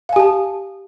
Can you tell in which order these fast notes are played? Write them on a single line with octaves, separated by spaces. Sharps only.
F5 G#5 G4 A5